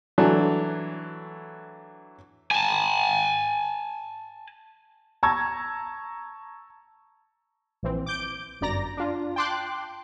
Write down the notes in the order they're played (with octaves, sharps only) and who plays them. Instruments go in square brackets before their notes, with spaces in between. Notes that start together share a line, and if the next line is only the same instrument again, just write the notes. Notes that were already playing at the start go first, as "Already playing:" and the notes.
[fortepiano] E3 F#3 A3 D4
[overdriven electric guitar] G#5 A5
[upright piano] A5 A#5 C#6 E6 G#6
[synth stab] A#1 E3 C4
D6 G6 D7
G1 F#2 D5 A#5 A#6
D4 F4
G5 A5 C6 D6 F#6